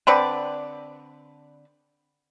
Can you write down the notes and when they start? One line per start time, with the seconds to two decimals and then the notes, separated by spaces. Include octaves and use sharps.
0.07 D3 C4 B4 D5